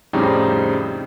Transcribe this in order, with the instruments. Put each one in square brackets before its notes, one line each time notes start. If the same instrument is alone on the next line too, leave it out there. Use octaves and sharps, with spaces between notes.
[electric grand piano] F2 A2 C#3 G3 C4 D#4